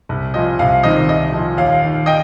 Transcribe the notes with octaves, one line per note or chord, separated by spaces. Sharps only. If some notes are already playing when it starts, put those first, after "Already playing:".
C2
A#2 F3 D#5
C2 F5
C3 D#3 D#5
C2 D#5
A#2 F3
D#2 F5
D#3
D#5 G5